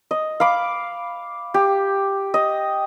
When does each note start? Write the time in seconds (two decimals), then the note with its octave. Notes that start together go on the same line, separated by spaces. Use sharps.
0.11 D#5
0.40 F5 B5 D6
1.54 G4
2.34 D#5